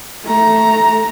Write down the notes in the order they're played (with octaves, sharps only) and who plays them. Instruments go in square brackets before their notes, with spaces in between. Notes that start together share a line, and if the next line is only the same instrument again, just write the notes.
[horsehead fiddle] A3 A#5